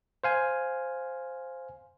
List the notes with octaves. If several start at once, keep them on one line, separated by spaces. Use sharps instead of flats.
C5 F5 G#5